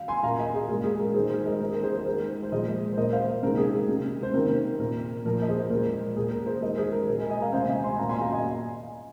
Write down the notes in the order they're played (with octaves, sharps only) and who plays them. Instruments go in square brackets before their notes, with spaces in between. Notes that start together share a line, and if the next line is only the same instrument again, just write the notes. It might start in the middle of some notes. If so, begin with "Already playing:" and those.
Already playing: [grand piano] F5
G#5 C6
A#2 F5 A#5
A#3
D#5 G#5
G#4
A#2 G#3 A#4
G#4
A#4
D#3 G#4 C5
G#3
G#4 C5
A#4 D#5
D#3 A#3 A#4
G#4
A#4
G#4 C5
C5
D#3 G#3 A#4
C5
A#2 F3 G#3 A#4 D#5
C5
A#2 A#3 A#4 D#5
C5 F5
C3 D#3 G#3 A#4
G#4
G#4
C3 G#3
C5
C3 D#3 A#3 A#4
A#2 A#3 A#4
A#2 F3 A#3 A#4
D#5
G#4 C5
A#2 G#3 A#4
A#2 A#3 G#4
A#4
G#4 C5
D#3 G#3 A#4 D#5
G#4 C5
A#4
A#2 A#4
G#3
D#5 G#5
D#5 G#5
F5 A#5
C3 G#3 C5 F5
F5
D#5 G#5
G#5 C6
A#2 A#3 F5 A#5
G#5 C6
F5 A#5
D#5 G#5